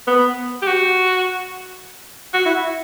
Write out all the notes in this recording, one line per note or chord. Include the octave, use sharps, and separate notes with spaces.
B3
G4
F#4
F#4
E4